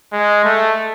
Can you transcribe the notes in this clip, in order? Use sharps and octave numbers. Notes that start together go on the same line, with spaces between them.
G#3
A3